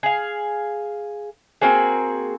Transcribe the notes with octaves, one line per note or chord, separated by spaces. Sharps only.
G#4 F5
A#3 C4 F#4 G#4